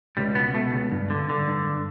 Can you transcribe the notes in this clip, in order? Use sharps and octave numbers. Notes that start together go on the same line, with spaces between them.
C#2 G3
B2 B3
B2 A3
C#2
G2
D3
D3
G2